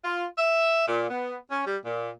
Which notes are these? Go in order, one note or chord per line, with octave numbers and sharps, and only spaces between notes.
F4
E5
A#2
B3
C#4
G3
A#2